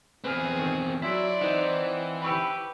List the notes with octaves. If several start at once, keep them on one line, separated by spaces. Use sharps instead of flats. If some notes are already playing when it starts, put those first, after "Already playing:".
E2 C4 G#4 B4 F6
D#3
F#3 E4 D5 C6 E6 B6
E3 C4 D#4 C5 F#5
G4 B4 B5 C#6 E6